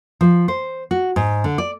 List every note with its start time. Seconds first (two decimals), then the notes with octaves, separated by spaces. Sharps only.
0.21 F3
0.48 C5
0.91 F#4
1.16 G#2
1.44 D3
1.58 D5